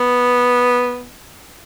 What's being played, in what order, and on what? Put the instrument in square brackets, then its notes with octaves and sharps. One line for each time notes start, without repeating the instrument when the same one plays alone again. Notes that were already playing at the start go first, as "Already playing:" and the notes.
Already playing: [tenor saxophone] B3